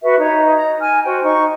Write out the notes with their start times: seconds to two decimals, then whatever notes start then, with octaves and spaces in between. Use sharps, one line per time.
0.02 F#4 B4 E5
0.20 D#4 C#5
0.56 A#5
0.80 G#5 F6
1.04 F#4 C5 G5
1.23 D#4 C#6